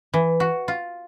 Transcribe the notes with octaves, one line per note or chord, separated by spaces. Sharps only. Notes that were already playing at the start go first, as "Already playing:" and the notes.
E3
F#4
F4